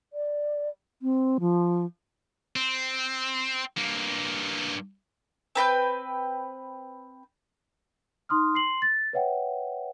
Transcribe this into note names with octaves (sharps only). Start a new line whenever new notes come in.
D5
C4
F3
C4
G2 A#3
C4 B4 G5 G6
D#4 C6 D#6 F6
C6 C7 F#7
A6
B4 C#5 E5 F#5 G5